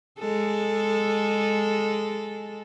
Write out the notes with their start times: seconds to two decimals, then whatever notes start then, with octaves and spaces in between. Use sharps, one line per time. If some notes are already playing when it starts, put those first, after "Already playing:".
0.19 G#3 A4